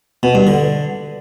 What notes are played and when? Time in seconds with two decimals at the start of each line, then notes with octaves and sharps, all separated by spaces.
0.23 B2
0.35 G2
0.47 D3